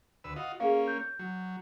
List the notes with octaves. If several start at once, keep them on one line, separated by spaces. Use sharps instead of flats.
D2 B4 E6
F4 F#4 D#5
A#3 C#4 G#4 F5
G6
F#3